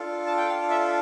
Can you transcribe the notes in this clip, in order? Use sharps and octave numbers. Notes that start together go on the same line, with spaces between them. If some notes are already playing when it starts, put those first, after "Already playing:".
Already playing: D4 F4 A4
A5
G5
F5
E5